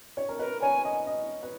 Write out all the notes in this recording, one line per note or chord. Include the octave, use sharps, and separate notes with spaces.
C#5
A#4
A#4 B4
C#5 G#5
D#5
D#5
B4